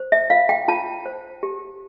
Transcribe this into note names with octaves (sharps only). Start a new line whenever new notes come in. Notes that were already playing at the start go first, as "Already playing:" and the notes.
Already playing: C5
E5
F4 F5
G5
F4 A5
C5
G4